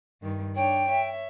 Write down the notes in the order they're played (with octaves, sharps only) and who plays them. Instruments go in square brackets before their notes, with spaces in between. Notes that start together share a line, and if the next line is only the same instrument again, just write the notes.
[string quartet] G2 D#3
[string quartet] D4 C#5 [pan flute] G5
[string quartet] C#5 E5